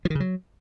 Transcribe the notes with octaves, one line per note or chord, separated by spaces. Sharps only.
F3
D#3
C#3
F#3